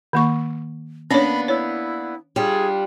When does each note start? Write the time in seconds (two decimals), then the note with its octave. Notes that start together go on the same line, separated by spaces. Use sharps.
0.13 D#3 A#3 C#6
1.11 A#3 B3 C#4 D4 C#5 B5
1.48 E4 C#5
2.36 G3 D4 F4 G#4